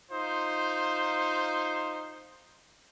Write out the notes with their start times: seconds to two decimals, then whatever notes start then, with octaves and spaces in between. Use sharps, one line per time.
0.12 D#4 F4 C5